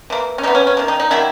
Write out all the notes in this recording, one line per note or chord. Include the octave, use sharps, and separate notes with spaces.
E3 A#3
C#4
E3 B3 D#4
C#4
C#4
D#3 A#3
D#4
D#4
D#3 F#3 A#3 E4